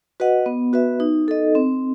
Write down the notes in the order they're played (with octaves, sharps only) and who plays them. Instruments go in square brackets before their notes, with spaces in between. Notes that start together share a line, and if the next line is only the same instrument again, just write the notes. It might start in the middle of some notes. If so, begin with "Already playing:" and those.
[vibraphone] F#4 B4 D#5 F#5
B3
F#4 B4 E5
D#4
A4 D#5
C4